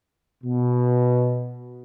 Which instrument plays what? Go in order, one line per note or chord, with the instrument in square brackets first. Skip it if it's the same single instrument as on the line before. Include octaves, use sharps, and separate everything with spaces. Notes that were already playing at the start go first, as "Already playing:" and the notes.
[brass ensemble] B2